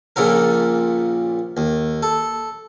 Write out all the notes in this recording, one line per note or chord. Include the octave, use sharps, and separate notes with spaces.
A#1 A#2 C#3 A4 A#4
D#2
A4